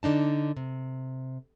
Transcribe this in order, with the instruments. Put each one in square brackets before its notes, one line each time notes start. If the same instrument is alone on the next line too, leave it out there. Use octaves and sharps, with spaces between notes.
[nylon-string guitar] D3 D4 D#4 A5
C3